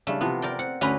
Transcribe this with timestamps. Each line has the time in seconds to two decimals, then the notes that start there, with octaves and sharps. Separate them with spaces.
0.07 C#3 G3 A3 D4
0.21 C3 E3 F3 B3
0.42 A#4 D5 G5
0.59 C4 F#5
0.81 D2 D3 C#4 B4 A#5 B5